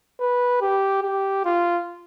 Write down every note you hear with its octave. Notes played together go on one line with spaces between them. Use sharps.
B4
G4
G4
F4